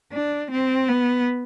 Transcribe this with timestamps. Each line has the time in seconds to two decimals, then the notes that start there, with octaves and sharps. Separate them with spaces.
0.13 D4
0.51 C4
0.88 B3